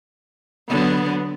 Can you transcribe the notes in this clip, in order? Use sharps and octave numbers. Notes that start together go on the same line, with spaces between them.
D3 F#3 B3